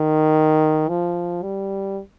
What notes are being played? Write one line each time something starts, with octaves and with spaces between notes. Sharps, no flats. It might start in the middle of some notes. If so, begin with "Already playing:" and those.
Already playing: D#3
F3
G3